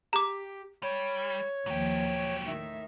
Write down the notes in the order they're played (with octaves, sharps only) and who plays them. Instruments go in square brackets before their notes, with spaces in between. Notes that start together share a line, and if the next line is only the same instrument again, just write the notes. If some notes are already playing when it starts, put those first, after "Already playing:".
[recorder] G4 [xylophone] A#5 D6
[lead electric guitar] G3 [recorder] C#5
[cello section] D#2 F3 [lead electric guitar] F#3 G4
[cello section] A2 D#3 [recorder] E5